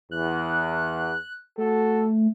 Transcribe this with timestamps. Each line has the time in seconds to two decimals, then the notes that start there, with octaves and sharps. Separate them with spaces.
0.11 E2 F#6
1.58 A3 F#4 A4